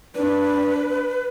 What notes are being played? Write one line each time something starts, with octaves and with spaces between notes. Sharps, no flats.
D4 B4